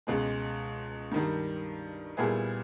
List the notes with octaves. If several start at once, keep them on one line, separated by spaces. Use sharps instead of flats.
C#2 B2 G#3
G2 D#3 G3
A#2 G3 B3 E4 G#4